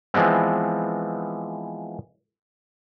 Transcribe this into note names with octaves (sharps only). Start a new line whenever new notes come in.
E3 F3 G#3 B3 C4